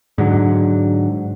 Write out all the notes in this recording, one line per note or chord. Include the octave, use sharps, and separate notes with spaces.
G#2 D3 F#3